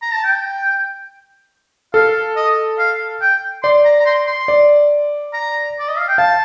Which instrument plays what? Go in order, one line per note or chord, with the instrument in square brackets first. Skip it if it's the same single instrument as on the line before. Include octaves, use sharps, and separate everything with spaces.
[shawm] A#5
A5
G5
[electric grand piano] A4 [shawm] F5
[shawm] D#5
F5
G5
[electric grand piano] D5 [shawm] C6
[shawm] A#5
A#5
C6
C6
[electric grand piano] D5
[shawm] A#5
D5
D#5
F5
G5
[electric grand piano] F5 [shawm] A5